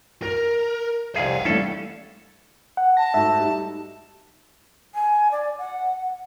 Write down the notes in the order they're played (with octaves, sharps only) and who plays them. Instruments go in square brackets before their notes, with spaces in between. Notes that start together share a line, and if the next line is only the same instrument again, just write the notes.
[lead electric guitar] A#4 [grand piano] A#6 D7
[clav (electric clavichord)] C2 F2 G#4 [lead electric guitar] E5 F5
[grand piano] E3 G3 A3 [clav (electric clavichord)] C#4 A4
[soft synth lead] F#5
[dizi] A5 [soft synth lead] A#6
[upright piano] G#2 A3 F#4 [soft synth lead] E5
[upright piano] G3 D#4
[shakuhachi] G#5
D5
F#5